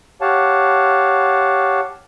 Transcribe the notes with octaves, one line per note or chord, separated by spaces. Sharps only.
G4 C#5 F5 F#5 A5